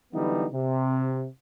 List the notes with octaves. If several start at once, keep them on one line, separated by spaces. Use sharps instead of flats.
D3 E3 F#3 G3 B3 D#4
C3